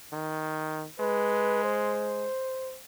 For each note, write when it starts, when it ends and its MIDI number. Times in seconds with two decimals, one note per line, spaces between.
0.12 0.85 51
1.00 2.27 56
1.00 1.62 71
1.64 2.78 72